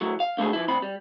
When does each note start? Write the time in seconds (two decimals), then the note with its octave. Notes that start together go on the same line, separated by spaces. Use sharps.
0.01 F#3 A3 E4
0.20 F5
0.37 C#2 D3 A3 E4 G#4
0.53 F3 E4
0.68 D2 C4 B5
0.82 G3